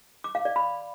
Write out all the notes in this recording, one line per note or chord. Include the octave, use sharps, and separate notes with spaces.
D6
F5
D5
B5